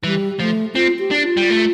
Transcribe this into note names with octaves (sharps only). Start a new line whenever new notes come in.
E3 G3
F3 A3
C4 F4
G4
D4
F4
G3
A3